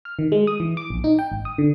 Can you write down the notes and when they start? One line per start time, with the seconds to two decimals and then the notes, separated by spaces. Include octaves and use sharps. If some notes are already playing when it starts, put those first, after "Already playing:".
0.05 F6
0.19 D#3
0.32 G#3
0.47 D#6
0.60 E3
0.77 D6
0.90 A#1
1.04 D#4
1.19 G5
1.32 G#1
1.45 D#6
1.58 D3